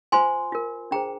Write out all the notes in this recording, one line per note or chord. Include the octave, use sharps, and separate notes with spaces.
F4 C5 G#5 C6
F4 A#4
D4 G#4 C5 G5 A#5